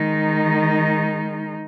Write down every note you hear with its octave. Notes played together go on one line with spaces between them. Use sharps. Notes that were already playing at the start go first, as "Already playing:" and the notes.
Already playing: D#3 G#3 D#4